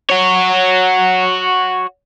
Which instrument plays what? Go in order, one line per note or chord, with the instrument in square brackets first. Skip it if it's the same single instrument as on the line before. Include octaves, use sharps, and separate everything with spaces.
[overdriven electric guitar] F#4 C#5